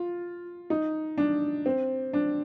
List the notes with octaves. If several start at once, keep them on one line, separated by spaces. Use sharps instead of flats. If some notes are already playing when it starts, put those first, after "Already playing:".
Already playing: F4
D#4
D4
C4
D4